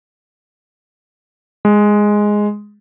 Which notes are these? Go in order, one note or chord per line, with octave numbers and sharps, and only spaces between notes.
G#3